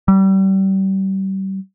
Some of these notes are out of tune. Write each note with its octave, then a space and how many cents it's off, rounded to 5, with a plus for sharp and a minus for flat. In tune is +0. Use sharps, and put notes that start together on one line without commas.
G3 -30